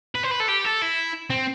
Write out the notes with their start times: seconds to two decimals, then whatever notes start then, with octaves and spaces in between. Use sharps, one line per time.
0.15 B4
0.23 C5
0.31 B4
0.40 A4
0.48 G4
0.64 A4
0.81 E4
1.30 C4